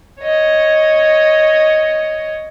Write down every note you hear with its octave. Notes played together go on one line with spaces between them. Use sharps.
C#5 D#5